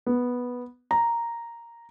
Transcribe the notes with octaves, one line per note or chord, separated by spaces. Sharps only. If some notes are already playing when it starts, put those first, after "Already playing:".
B3
A#5